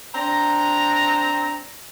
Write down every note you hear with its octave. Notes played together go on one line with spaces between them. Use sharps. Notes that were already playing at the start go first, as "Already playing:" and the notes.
C4 D4 A#5